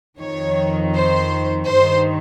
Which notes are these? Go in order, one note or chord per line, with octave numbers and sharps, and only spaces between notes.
F2 D#3 C#5
C5
G2 D#3 C5